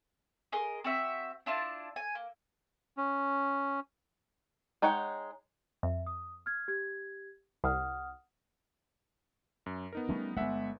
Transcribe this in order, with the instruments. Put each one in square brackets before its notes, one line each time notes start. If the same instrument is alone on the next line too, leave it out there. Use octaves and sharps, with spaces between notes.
[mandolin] G#4 A#4 D#5 C6
C4 F#4 E5
D4 E4 F4 A5
G#5
A#3
[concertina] C#4
[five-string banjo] G#3 D#4 C#5 F#5 G5
[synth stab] F2 [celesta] E5
[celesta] D#6
F6 G#6
G4 G#6
[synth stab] C2 [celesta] F#5 D#6 F6
[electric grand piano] F#2
B3 D#4 A#4
[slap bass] G3 A3 C#4
[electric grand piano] G1 E5 F#5 [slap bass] G#3 B3